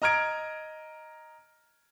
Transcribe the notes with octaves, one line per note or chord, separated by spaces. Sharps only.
D#5 A#5 F6 G#6 D7